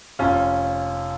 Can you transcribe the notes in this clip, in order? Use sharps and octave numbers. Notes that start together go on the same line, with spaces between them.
F1 C#4 F4